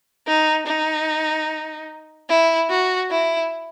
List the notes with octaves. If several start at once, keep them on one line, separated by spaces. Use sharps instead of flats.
D#4
D#4
E4
F#4
E4